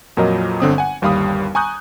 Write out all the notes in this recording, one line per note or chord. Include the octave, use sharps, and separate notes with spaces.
F2 A#2 F#3 A#4 D#5
G1 D3 C4 D#6
F#5 G#5
G1 D#2 G3 F5 B5 D#6
G#5 A#5 C#6 D#6 F#6 G6